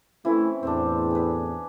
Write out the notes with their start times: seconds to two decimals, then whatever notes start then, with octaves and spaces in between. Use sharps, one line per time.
0.25 E3 A3 C4 C#4 E4
0.63 E2 A2 C4 D4
1.11 G#4 B4